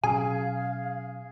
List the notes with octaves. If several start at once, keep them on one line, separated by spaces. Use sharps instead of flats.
B2 F#3 C#4 G#4 F5 G#5